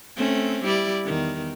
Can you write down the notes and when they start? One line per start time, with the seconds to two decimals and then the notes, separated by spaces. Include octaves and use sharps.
0.16 A3 C4 C#4
0.64 G3 E4 D5
1.05 E2 D#3